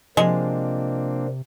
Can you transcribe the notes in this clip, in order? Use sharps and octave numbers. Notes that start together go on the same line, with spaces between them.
C3 F3 G#3 A#3 C4 D4